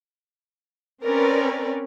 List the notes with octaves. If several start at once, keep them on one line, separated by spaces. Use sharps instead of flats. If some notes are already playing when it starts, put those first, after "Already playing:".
C4 C#4 A#4 B4 C#5 D5